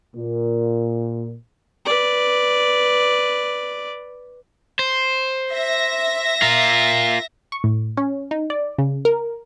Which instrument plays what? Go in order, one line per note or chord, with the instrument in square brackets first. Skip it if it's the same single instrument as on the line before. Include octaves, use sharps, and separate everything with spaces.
[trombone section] A#2
[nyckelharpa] B4 D5
[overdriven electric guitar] C5
[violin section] E5 A#6
[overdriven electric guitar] F4 A#4
[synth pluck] C#6
A2
C#4
D#4
D5
C#3
A#4